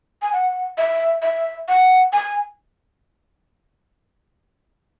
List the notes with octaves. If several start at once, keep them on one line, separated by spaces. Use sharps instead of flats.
G#5
F#5
E5
E5
F#5
G#5